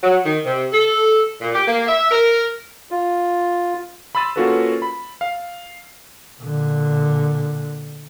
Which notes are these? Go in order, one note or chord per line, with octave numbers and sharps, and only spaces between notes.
F#3
D#3
C3
A4
A#2
G4
A#3
E5
A#4
F4
B5 C6 E6 A6 D#7
A#3 C#4 F4 F#4 A4 B4
B5
F5
A#2 D3